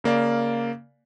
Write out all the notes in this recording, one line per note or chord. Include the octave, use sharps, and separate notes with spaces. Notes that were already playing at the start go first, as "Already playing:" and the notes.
C#3 A#3 D5 F5